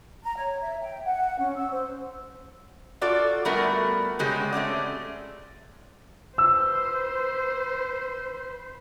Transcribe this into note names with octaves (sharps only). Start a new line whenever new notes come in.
A#5
C#5
E5
G5
F#5
C#4
E6
C5
F4 F#4 A4 D5
G3 A3 B3 F#4 A#4
C#3 G#3 F#4 G4
A3 C4 C#4 D5
B4 C5 E6